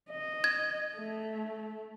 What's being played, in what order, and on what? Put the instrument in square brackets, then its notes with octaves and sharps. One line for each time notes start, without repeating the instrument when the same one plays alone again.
[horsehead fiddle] D#5
[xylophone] G#6
[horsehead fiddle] A3